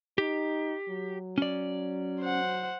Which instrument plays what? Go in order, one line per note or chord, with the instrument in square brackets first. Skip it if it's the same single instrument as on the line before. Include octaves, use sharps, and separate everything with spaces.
[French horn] D#4 [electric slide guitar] G4
[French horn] F#3
[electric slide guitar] C#4 D5
[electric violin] C5 F#5